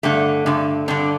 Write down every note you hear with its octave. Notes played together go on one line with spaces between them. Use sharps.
G2 D3 A3
G2 D3
G2 D3 D4